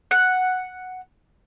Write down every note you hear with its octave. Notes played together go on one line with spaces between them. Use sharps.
F#5